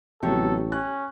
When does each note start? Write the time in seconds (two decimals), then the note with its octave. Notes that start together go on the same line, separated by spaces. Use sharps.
0.23 A1 C3 F#3 B3 G4 A4 C#5
0.72 C#4 F#6